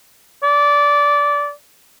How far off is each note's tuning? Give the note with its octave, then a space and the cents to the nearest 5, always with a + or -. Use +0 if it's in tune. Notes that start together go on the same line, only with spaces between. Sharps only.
D5 -15